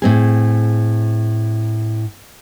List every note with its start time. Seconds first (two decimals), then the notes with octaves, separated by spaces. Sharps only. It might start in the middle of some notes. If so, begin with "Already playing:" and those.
0.02 A2 C4 G#4